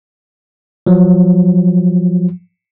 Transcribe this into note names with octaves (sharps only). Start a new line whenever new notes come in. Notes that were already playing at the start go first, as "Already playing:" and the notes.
F3 F#3